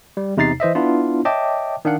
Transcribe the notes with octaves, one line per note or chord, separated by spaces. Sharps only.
G3
E2 C3 D#4 A#5 A6 C7
E3 C5 D#5 E5
B3 D4 E4 F4
C#5 D#5 E5 G5 A5 D6
D#3 D4 F5 F#5